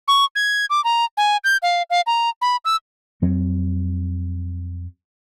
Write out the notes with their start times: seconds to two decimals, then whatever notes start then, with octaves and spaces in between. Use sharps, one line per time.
0.08 C#6
0.35 G#6
0.70 D6
0.84 A#5
1.17 G#5
1.44 G6
1.62 F5
1.90 F5
2.07 A#5
2.42 B5
2.65 E6
3.22 F2 F#3 C4